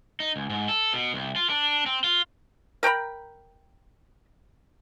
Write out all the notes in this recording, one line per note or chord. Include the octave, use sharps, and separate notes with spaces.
D#4
C#2
G#2
A4
B2
C2
F4
D4
C4
F4
A#4 G5 A#5 B5